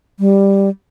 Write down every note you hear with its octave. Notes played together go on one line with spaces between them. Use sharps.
G3